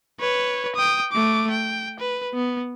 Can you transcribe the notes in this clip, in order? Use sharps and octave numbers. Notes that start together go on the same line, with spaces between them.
B4 C#5
G5 D#6
A3 D6
G5
B4
B3